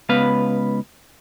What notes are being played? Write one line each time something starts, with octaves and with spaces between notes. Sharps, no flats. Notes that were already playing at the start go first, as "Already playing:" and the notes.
C#2 B3 B4 F5